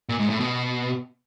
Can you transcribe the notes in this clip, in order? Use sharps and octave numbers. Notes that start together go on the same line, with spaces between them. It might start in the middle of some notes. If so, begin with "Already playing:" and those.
A#2
G#2
A2
B2